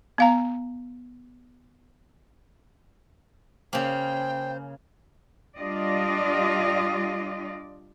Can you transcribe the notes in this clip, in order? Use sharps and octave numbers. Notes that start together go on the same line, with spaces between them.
B3 F5 A#5
C#3 A#3 C5 G5
G3 D4 F4 G4 D5 D#5